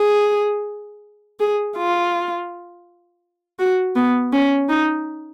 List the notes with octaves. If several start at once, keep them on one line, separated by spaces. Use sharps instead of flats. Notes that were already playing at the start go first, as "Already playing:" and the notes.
Already playing: G#4
G#4
F4
F#4
B3
C#4
D#4